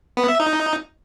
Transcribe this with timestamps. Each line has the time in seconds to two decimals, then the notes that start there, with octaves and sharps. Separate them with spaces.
0.17 B3
0.28 E5
0.40 D#4